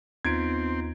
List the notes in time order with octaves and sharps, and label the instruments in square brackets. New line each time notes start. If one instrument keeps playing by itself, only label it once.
[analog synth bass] D#2 [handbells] B3 D#4 F4 [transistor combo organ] C4 [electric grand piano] G#6 D7